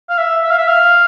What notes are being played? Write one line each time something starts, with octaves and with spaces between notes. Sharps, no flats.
F5
E5
E5
F5
E5
F5